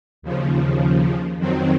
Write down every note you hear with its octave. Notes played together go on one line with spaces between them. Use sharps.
D#2 C#3 F3
F2 D#3 F#3 C4